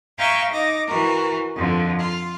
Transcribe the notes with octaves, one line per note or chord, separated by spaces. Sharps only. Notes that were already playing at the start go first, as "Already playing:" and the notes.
E5 F5 G5 G#5 A#5 C#6
D#4 D6 A#6
E3 F#4 A#4
F2 D3
F4